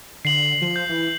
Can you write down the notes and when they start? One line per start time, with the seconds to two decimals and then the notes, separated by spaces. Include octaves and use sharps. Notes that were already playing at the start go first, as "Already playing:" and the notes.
0.25 D3 C7 F#7
0.61 F3
0.76 G6
0.89 E3